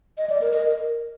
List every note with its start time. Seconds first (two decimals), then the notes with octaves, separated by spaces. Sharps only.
0.18 D#5
0.30 D5
0.41 A#4
0.53 D#5
0.65 A#4